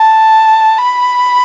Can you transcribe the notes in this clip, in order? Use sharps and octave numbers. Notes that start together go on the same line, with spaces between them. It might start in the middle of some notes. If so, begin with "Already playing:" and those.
Already playing: A5
B5